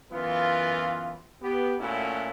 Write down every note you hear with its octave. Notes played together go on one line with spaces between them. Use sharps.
F#2 E3 B3 F4
B3 G4
A#2 A3 C#4 E4 F#4